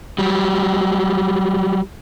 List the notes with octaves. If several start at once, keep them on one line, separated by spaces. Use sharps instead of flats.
F#3 G3